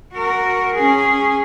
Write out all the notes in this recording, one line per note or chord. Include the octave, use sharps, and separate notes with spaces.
F#4 A#4
C#4 G#4